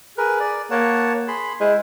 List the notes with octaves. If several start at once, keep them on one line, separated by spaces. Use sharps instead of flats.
G#4 A#4 B4
D5
A#3 C#5 F#5 A5
G#4 B5 C6
G#3 E4 C5